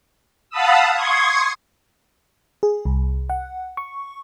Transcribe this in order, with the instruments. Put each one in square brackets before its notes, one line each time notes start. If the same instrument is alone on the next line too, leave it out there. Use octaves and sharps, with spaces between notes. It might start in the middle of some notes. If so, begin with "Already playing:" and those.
[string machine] F5 F#5 A5 B5 D#6 E6
C6 C#6 D#6 G#6
[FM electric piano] G#4
C2
F#5
C#6